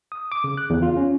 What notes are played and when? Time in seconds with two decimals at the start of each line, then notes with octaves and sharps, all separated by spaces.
0.12 D#6
0.32 D6
0.44 C#3
0.58 F#6
0.70 E2
0.82 F4
0.97 C#4